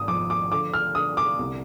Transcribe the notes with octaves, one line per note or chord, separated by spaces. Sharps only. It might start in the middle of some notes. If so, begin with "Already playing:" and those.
Already playing: G#1 D#6
F3 D6
D6
D3 D6
F6
D3 D#6
D6
C2